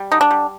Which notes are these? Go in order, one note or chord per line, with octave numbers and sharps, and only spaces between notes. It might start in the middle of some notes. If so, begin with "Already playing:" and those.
Already playing: G3
D3 D#4
D4
G3